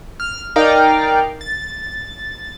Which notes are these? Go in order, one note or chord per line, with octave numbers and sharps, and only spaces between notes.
F6
D#4 A#4 D5 F5 G5 A#5
A6